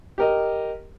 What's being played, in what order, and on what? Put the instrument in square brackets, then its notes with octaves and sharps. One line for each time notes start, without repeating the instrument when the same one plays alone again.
[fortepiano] G4 A#4 D#5